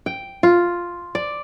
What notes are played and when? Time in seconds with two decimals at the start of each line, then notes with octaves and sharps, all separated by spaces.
0.06 G5
0.43 F4
1.15 D5